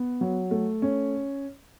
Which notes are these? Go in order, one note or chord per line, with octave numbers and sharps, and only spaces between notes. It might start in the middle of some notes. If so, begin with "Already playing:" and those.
Already playing: B3
F#3
A3
C#4